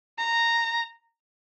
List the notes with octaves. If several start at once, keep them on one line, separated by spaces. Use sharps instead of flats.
A#5